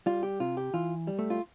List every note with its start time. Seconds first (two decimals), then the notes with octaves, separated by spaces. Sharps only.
0.06 G3 F4
0.23 G4
0.40 C3 F4
0.57 G4
0.74 E3 F4
1.07 G3
1.19 A3
1.30 F4